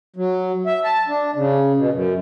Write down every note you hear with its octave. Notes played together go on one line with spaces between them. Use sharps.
F#3
E5
A5
D4
C#3
B2
F#2